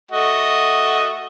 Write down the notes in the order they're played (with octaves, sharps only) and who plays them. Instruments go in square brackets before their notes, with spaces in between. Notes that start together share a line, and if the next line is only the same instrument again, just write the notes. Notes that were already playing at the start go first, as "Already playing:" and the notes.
[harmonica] A3 F#4 D#5